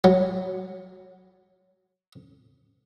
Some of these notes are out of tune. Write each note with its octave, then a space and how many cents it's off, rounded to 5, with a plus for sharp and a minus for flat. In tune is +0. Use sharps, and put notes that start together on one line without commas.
F#3 +0